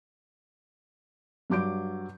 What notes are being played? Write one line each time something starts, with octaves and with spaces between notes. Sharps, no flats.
G2 F#3 D6 G6 D7